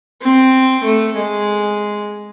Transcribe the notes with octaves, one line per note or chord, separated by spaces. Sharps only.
C4
A3
G#3